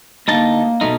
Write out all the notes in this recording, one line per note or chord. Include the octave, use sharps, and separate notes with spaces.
D2 A#3 D#4 A5
B2 A3 D#4